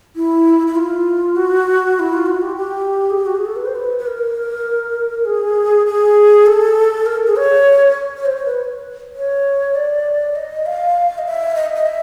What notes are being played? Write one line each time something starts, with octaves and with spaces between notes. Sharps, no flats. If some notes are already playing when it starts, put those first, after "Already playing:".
E4
E4
F4
F#4
E4
F4
F#4
G4
G4
G#4
G4
F#4
G#4
A4
B4
C5
B4
B4
A#4
G#4
G#4
A4
A#4
G#4
C#5
C#5
C5
C#5
B4
C#5
D5
D#5
F5
D#5
E5
D#5
D#5
E5